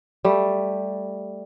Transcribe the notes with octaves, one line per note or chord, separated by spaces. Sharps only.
G3 A3